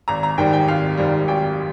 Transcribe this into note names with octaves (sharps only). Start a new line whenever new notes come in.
G#1 A#5
A#5
G#2 D#3 G3 G5
G5
G#1 F5
G#2 D#3 G3
G#1 G5